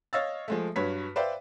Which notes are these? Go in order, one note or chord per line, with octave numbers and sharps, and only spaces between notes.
C#5 D#5 F5 E6 F6 A6
F3 G#3 A3
G2 F#3 B4 C#5 B6
B4 C5 D5 E5 F5 G5